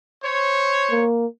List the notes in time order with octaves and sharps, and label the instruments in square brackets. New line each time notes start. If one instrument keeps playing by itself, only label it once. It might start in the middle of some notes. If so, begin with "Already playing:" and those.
[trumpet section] C5 C#5
[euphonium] A#3